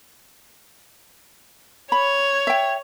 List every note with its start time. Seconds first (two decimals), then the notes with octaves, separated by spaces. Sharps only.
1.92 C#5 B5
2.47 E5 G5